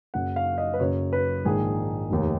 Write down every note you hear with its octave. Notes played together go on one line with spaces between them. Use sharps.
F#1 F#2 C#3 F#5
F5
D#5
B4
F#1 F#2 C#3 C#5
B4
A#1 G#2 D#3 G#4
F1 D#2 D#3